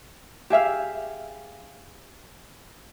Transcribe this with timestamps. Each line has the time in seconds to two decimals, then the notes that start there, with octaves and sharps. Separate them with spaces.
0.50 G4 G#4 E5 F5